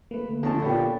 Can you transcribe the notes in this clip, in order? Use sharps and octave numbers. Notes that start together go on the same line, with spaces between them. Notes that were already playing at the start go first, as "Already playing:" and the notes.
A3 A#3 B4
D3
F2 C#3 A4 C#5 A5
A#2 B3 D4 G4